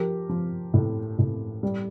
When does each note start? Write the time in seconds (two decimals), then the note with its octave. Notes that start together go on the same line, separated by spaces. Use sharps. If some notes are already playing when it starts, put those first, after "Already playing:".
Already playing: F3 G4 A#4
0.29 F3
0.74 A2
1.19 A2
1.63 G3